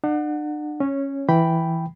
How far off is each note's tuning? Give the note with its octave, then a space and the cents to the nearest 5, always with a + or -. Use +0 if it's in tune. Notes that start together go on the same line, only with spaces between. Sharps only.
D4 +40 F#5 -15
C#4 -10 C#5 +0
E3 +0 G5 +0 B5 +0